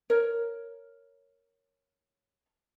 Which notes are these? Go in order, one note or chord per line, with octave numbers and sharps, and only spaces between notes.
A#4 C#5